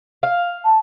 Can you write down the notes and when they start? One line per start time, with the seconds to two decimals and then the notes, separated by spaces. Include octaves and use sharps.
0.23 F5
0.65 A5